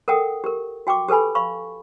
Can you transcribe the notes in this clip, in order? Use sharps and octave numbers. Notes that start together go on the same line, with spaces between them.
A4 A#4 F#5 G5 D#6
G4 A#4
F#4 G5 C#6 D6
G4 A4 B4 G#5 B5
F5 B5 C#6